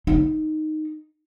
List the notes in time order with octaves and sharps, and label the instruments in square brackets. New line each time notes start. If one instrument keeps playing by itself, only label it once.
[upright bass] D#4